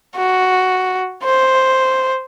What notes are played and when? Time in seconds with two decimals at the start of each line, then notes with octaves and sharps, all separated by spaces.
0.16 F#4
1.24 C5